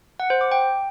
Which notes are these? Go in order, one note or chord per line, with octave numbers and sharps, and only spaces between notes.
F#5
C5
D6
G5